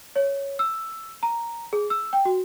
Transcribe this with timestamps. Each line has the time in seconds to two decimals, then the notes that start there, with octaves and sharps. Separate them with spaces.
0.16 C#5
0.59 E6
1.23 A#5
1.73 G#4
1.90 E6
2.13 G5
2.25 F#4